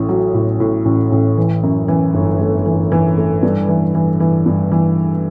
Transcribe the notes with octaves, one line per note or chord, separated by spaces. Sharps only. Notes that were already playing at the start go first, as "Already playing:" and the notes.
Already playing: A1 A2
F#3
A2
A2
A1
A1
E3
F#2
E3
G1
A3
E3
E3
A3
G2
E3
E3
E3
G2
E3